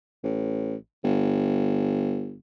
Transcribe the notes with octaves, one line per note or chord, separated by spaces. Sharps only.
A1
G1